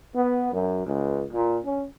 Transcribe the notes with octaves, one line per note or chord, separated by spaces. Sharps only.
B3
F#2
C#2
A#2
C#4